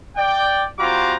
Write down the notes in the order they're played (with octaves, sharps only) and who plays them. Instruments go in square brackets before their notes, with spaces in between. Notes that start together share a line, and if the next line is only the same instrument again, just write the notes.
[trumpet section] D5 G5
G3 C4 F4 F#4 A#5 D6